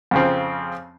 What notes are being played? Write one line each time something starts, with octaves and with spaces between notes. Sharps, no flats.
F2 C#3 F3 C4